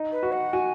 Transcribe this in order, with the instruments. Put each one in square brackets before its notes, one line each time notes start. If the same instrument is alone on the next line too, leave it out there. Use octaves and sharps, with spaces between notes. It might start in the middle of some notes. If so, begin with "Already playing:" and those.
Already playing: [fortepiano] D#4
[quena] B4
[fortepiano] F#4
[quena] F#5
[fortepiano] F#4 [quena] G#5